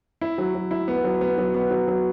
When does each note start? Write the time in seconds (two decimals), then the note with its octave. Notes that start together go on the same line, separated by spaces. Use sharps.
0.21 E4
0.38 F#3
0.54 F#3
0.71 E4
0.88 B3
1.04 F#3
1.21 B3
1.38 F#3
1.54 B3
1.71 F#3
1.87 F#3